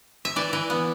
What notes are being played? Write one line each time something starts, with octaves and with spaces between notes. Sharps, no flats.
E5
E3 D5
E3
B3